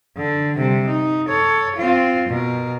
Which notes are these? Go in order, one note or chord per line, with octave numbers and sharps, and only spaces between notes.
D3
C3 G3
D#4
A4 C#5
C4 F4
B2 A#4